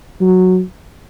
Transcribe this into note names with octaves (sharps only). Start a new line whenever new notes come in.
F#3